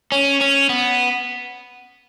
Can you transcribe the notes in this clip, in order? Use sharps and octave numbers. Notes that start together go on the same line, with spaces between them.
C#4
C#4
B3